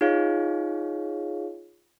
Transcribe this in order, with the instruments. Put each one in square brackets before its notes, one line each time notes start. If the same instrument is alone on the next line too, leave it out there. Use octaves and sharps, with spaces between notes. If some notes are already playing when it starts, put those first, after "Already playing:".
[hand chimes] D#4 F4 G#4 C#5 F5